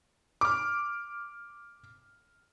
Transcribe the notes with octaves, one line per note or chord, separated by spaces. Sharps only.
D6 F6